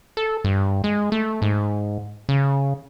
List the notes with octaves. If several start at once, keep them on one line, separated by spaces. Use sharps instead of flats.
A4
G2
G#3
A3
G#2
C#3